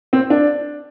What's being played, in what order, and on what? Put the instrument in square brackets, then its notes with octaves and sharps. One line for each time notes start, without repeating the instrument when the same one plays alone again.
[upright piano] C4
D4